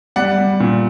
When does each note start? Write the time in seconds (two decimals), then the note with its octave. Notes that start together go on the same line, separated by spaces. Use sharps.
0.16 G3 D5 F#5
0.38 G3
0.60 A#2